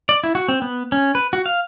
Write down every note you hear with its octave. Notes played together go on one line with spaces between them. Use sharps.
D5
E4
F#4
C4
B3
C#4
B4
F#4
F5